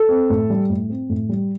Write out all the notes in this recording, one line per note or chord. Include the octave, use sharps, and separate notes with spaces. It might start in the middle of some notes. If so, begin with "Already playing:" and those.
Already playing: A4
C4
A2
G3
A2
C4
A2
G3